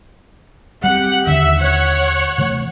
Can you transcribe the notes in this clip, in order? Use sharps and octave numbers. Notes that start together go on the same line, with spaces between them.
G3 C4 G4 F#5
D#2 D3 D#3 E5
C#5 F#5
C3 E3 A3